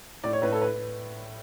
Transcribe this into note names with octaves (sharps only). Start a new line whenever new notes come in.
A2 D5
C#5
A2 B4
A4
B4